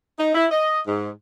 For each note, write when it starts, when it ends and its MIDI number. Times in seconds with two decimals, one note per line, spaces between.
0.19 0.33 63
0.35 0.46 64
0.51 0.80 75
0.87 1.10 44